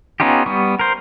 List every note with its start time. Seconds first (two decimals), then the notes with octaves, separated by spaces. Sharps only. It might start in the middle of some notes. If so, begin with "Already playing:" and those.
0.20 B3 C#4 D#4 F4 G4
0.46 G3 B3 C#6
0.79 A#4 C5